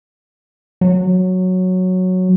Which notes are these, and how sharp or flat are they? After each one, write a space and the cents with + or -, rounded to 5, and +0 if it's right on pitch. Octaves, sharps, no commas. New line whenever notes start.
F#3 -5